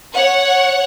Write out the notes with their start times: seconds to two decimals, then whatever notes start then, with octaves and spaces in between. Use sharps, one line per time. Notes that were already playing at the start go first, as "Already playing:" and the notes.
0.14 C#5 F#5